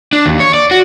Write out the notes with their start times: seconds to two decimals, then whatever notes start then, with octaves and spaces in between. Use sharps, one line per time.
0.13 D4
0.26 D#2
0.40 C#5
0.54 D5
0.71 F#4